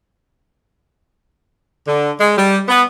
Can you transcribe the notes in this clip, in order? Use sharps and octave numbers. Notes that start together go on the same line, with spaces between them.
D3
G#3
G3
B3